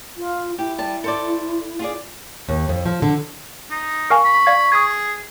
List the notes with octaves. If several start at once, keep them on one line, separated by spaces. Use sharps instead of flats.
F4
E4 G4
G3 A5
A4 C5 D5
F4 G#4 D5
D#2
F2
F3
D3
D#4
A#4 F5 G#5 C#6
B5
D5 F5 G#6
G#4 D#6 G#6